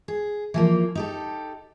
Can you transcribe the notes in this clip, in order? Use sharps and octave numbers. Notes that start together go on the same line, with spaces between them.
G#4
E3 F3 A#3
D#4 G4 A4